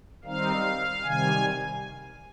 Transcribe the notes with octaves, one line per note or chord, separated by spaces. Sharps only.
D#3 G3 C4 D#4 F5
C3 D#3 G3 G#5